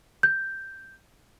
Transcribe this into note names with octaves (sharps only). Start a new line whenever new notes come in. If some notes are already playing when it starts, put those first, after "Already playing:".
G6